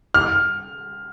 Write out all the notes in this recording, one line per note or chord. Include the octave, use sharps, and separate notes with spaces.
F6